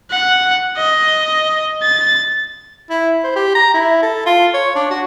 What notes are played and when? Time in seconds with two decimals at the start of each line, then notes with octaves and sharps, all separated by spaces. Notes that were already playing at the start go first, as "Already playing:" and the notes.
0.10 F#5
0.77 D#5
1.83 A6
2.90 E4
3.24 C5
3.36 G4
3.55 A#5
3.74 E4
4.02 A4
4.26 F4
4.54 C#5
4.75 D4
4.90 F#4